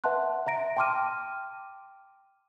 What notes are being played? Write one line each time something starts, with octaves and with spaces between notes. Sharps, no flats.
B4 E5 F#5 A5 C6 F#6
E5 A#5 A#6 D7
G5 A5 C6 D6 F6 D#7